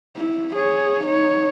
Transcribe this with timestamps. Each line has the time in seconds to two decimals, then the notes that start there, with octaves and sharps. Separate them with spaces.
0.17 E4
0.56 G#4 C#5
1.04 D#4 C#5